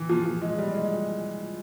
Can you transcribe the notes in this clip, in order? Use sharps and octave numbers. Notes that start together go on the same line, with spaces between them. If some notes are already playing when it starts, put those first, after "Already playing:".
Already playing: E3
F3
F3
G#3
G3
G#3